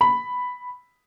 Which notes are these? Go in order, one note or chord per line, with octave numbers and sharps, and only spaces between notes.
B5